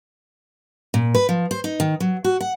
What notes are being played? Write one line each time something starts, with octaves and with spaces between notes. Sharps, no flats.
A#2
B4
F3
C5
D#4
D#3
F#3
F#4
F#5